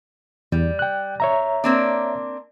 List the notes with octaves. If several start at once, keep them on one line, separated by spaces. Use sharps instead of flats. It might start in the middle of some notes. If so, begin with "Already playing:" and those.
E2 G3
G5 F#6
C#5 E5 A#5
A#3 C4 D4